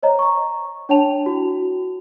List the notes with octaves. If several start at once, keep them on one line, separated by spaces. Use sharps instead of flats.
C5 C#5 D#5 A#5
A#5 C#6
D4 C#5 G5 A5 F7
E4 F#4